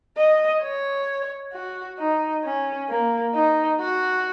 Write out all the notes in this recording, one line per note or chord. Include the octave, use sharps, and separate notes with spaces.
D#5
C#5
F#4
D#4
C#4
A#3
D#4
F#4